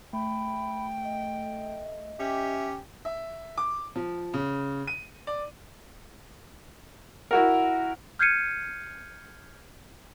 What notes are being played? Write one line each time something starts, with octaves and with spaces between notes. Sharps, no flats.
A3 G5 B5
D#5
C#4 G4 E5
E5
D6
F3
C#3
D#7
D5
E4 F#4 A#4
F6 G6 G#6 C7 C#7 D#7